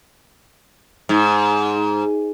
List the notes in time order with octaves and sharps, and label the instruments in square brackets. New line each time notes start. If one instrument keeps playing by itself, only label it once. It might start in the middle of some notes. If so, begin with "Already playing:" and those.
[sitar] G#2